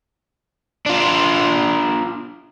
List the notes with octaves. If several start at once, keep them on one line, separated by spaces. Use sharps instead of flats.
D4 F4